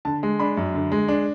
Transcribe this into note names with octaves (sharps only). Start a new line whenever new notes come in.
D3 A5
G#3
D4 B5
F#2
D3
G#3
D4